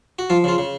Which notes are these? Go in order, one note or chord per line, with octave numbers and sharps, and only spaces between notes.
F#4
F3 F4
C#3 F4
C#3